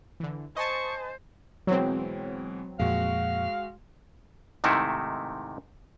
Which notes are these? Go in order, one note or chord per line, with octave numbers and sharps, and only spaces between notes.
D3 E3
C5 D#5 G#5 A5 C#6
B2 E3 F#3 G#3 C4
F2 A#2 G#3 F#4 F5
G#2 C3 D#3 A3 D#4 E4